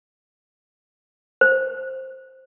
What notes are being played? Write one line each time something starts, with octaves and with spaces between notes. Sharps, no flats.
C5